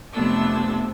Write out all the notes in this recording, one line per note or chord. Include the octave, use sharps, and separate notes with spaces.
F2 C3 A3 B3 D4 E6